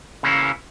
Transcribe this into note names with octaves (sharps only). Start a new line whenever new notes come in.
C#3 E3 A#3 C#4 E4